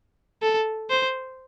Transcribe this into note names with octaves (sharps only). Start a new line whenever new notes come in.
A4
C5